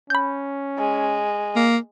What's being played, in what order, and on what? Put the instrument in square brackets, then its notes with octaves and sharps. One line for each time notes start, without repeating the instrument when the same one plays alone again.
[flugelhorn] C#4 [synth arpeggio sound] B5 G6
[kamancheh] G#3
[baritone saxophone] A#3